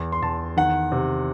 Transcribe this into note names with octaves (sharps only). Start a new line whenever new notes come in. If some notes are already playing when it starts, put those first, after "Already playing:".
Already playing: E2
C6
E2 A5
D#3 F#5
C3